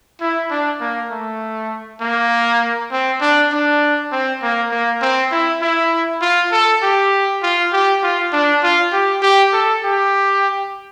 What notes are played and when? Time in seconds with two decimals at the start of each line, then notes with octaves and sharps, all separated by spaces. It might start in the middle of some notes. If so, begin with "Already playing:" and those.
0.21 E4
0.50 D4
0.80 A#3
1.10 A3
2.01 A#3
2.91 C4
3.21 D4
3.52 D4
4.12 C4
4.42 A#3
4.71 A#3
5.02 C4
5.31 E4
5.62 E4
6.21 F4
6.52 A4
6.82 G4
7.43 F4
7.72 G4
8.03 F4
8.32 D4
8.63 F4
8.93 G4
9.22 G4
9.53 A4
9.83 G4